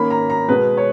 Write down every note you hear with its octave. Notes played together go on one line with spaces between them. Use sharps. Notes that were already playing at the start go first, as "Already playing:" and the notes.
Already playing: D#3 A#3 C#4 B5
A#5
A#5
B2 G#3 B3 B4
C#5